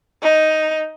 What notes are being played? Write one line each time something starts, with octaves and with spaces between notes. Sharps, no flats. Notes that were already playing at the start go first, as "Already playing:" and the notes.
D#4